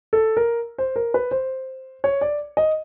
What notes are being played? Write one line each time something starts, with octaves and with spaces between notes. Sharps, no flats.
A4
A#4
C5
A#4
B4
C5
C#5
D5
D#5